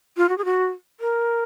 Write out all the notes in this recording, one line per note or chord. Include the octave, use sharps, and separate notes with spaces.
F4
F#4
G#4
F#4
A#4